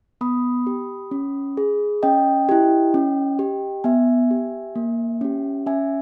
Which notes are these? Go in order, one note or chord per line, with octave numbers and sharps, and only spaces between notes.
B3 B5 D#6
G4
C#4
G#4
C#4 D#5 G5
E4 G4
C#4
G4
B3 E5 G#5
G4
A#3
C#4 G4
C#4 E5 G#5